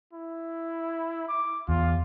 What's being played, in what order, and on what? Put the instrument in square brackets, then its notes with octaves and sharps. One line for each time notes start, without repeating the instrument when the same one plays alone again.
[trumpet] E4
D6
[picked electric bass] E2 [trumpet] F4